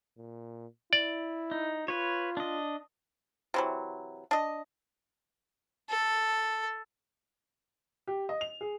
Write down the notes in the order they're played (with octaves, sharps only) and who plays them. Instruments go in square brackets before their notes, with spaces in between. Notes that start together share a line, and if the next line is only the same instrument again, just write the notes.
[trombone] A#2
[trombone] E4 [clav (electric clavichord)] D5
[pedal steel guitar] D#4
[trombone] F4 [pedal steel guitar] B4 C#5
[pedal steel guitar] D4 D#5
[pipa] C3 E3 F#3
D4 D#5
[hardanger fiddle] A4
[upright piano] G4
D#5
F7
G#4